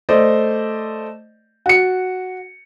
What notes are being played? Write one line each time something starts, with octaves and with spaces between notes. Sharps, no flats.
A3 C5 D5 D#5
F#4 C#7